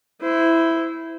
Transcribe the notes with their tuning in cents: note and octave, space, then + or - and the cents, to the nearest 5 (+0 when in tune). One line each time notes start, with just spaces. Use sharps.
E4 +0 C5 -20